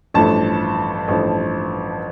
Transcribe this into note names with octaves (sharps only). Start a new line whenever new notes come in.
A1 G2 F3 A3 A5
A1 G2 F3 A3